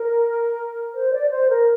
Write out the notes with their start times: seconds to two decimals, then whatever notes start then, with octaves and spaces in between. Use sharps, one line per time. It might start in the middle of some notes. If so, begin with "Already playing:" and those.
Already playing: A#4
0.94 C5
1.12 D5
1.31 C5
1.49 A#4